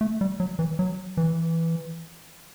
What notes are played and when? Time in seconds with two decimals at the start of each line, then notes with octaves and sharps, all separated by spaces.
0.01 A3
0.21 G3
0.40 F#3
0.59 E3
0.79 F#3
1.17 E3